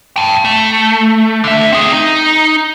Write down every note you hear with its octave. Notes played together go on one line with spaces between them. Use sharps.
G5 A5
A3
D3 E5
C4 G#4
D#4